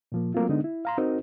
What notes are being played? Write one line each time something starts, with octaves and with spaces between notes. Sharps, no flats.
A#2 F3 A#3
F#3 A3 A#3 C4 F4
D3 G#3 B3 D4 D#4
E4
F5 A#5 C6
C4 D#4 F#4 A#4 C5